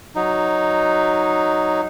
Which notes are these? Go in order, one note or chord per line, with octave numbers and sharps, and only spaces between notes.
F#3 D#4